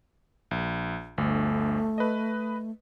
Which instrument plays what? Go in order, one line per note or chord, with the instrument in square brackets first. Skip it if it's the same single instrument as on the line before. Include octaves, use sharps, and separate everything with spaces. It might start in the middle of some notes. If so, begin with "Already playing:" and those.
[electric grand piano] A#1
[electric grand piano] G1 D2 [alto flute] A3
[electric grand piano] B4 D#5